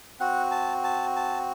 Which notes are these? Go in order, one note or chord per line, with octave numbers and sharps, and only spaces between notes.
C4 F#4 F#5
A5
A5
A5